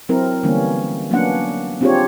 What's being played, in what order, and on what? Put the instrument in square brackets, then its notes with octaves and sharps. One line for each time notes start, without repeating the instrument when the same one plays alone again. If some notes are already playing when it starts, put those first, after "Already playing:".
[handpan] F#3 C4 E4 A#4
D3 E3 G3 A#3 B3 C#4
F#3 A#3 B3 C#4 D4 F#5
C4 D4 F4 G4 G#4 C#5